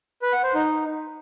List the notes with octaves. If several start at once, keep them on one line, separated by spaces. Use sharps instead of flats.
B4
F#5
C5
D#4